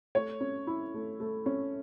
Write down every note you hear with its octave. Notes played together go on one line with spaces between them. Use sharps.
A3 C#5
C#4
E4
A3
A3
C#4